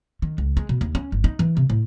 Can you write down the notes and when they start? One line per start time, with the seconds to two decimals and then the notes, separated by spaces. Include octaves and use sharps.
0.22 D#3
0.38 C#2
0.57 G#3
0.69 B2
0.81 D#2
0.95 C#4
1.12 G1
1.24 D#4
1.39 E3
1.57 C3
1.70 A2